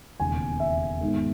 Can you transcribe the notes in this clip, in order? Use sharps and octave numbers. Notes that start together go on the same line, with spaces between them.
E1 D#2 C#3 G#5
E5
G#2 D#3 G#3 B3